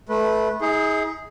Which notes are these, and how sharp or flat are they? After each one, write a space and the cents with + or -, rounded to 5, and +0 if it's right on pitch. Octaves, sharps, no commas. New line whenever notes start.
A3 -20 B4 -10
D#4 +40 G#4 +0